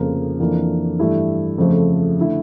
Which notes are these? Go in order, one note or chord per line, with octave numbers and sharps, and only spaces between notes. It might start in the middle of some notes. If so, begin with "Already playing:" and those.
Already playing: F1 F2 C#3 F3 A#3
F2 E3 A#3 D4
G2 E3 A3 E4 G4
F2 C#3 F3 A3
D3 A3 E4